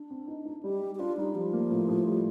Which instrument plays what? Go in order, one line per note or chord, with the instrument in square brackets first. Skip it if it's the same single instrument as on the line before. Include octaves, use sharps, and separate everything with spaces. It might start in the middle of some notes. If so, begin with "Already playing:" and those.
Already playing: [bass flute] D4
[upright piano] C4
D#4
D#4
[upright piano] G3 [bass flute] G4
[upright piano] G3
[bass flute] G4
[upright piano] D4 [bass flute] F4
[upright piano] G3 [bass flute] D#4
[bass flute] F3 [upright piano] G3
[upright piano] A#3
A2
A2
G3